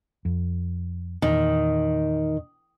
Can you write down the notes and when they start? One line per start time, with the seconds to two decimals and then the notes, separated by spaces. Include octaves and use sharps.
0.25 F2
1.22 E2 A#2 D#3